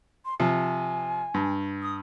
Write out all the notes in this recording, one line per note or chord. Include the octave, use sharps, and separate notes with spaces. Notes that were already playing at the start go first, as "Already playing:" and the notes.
C6
C3 F3 G#5
G2
D#6